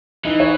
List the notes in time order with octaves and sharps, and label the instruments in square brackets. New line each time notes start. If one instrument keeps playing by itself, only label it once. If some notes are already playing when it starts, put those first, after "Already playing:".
[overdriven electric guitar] E3 [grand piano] D#4
[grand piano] C#5